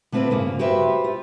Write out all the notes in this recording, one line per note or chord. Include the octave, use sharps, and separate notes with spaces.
D3 A3 C4 F4 B4 D5
G2 C#3 A#3
F#4 G4 B4 C5 E5
F4